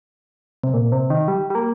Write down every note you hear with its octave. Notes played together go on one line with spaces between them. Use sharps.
C3
A#2
C3
D#3
G3
G3
A#3